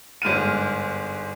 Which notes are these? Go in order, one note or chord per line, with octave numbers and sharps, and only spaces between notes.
G1 G#2 F6 D#7